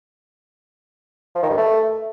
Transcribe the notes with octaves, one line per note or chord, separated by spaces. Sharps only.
F3
D#3
G2
A3